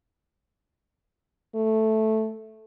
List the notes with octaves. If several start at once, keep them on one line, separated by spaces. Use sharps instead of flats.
A3